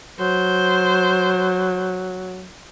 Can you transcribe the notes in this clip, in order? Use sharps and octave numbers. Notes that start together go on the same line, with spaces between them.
F#3 C5